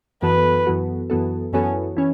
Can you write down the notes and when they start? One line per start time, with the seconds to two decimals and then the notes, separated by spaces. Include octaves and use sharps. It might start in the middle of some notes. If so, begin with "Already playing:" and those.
0.22 F#2 E3 B3 F#4 A4 B4
0.66 F#2 E3 B3 F#4 A4
1.10 F#2 E3 B3 F#4 A4
1.53 F#2 E3 B3 C#4 F#4 A4
1.97 E3 C#4